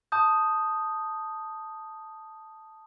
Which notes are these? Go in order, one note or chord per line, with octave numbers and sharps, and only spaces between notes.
A5 D#6 G6